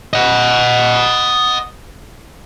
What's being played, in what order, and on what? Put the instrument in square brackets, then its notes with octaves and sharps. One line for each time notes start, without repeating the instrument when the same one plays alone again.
[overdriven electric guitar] D#5 F#5